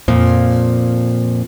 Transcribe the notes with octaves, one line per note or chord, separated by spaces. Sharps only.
F2 A#2 F3